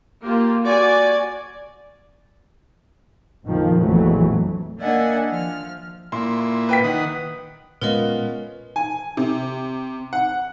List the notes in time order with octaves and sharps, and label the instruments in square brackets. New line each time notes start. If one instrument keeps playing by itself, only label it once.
[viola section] A#3 F4 G4
F#4 D5 G#5
[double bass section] A#1 F2 D#3 F3
A#1 F2 E3 F#3 A3
[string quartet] A#3 D4 D#5 E5 F#5 G#5
F3 F6
[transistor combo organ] A#2 E4 [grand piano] C6
[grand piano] C6
B4 G5 B6
[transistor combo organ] D#3 F#5 D#6
[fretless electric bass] A#2 G#3 [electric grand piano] B3 C#4 F4 [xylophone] A#4 B4 D#5
[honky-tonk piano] G#5
C3
F#5